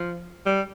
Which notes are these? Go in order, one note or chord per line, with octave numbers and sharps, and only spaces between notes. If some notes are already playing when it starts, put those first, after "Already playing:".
Already playing: F3
G3